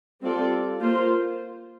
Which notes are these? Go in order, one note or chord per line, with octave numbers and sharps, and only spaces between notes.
G3 C4 F4 A4 D5
A#3 F4 C5